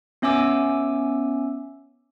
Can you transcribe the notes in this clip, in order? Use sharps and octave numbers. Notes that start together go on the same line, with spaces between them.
B3 C#4 E5 G#5 D6 E6